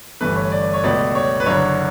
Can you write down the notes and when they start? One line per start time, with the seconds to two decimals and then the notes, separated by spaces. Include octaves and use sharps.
0.21 G1 G2 E3 A3 B4
0.36 C#5
0.52 D5
0.74 C#5
0.84 C#2 B2 A3 D5
1.15 C#5
1.40 B4
1.46 F#1 F#2 D3 C#5